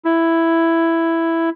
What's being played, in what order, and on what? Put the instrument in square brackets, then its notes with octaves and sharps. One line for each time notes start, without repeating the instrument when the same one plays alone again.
[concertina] E4